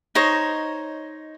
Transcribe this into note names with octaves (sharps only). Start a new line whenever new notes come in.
D#4 C5 C#5 D#5